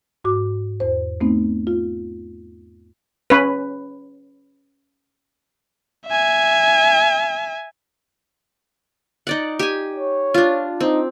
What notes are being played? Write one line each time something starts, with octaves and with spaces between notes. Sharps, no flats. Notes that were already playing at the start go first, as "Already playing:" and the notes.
G#2 F#4 D6
E2 C5
A3 B3 C4 D#4
F4
C#4 B4
E5 G#5
D#4 D5 F#5
G4 G#5
C#5
D4 F4
C4 D#4